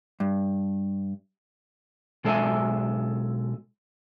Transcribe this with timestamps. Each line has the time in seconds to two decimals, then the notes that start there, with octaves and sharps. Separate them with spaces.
0.20 G2
2.24 B1 G#3 A4 C5 E5 G#5